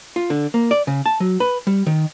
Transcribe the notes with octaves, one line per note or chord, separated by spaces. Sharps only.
F4
D3
A#3
D5
C#3
A5
F#3
B4
G3
D#3